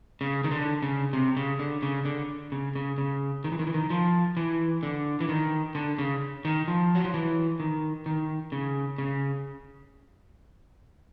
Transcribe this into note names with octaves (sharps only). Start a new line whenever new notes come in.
C#3
D#3
D3
C#3
C3
C#3
D3
C#3
D3
C#3
C#3
C#3
D#3
E3
D#3
E3
D#3
F3
E3
D3
E3
D#3
D3
C#3
D#3
F3
F#3
F3
E3
D#3
D#3
C#3
C#3